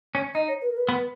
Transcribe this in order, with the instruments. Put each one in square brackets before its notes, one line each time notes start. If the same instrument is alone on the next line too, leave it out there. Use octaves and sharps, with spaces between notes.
[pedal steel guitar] C#4
[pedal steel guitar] D#4 [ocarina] D#5
[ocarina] C#5
B4
A#4
B4
[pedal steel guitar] B3